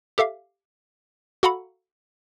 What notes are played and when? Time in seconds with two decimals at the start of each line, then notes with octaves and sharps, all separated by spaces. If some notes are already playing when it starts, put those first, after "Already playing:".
0.18 G4 A4 E5 F5
1.43 F#4 A4 F5 F#5 A#5 B5